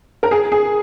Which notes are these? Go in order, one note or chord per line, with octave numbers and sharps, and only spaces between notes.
A#4
G#4
G#4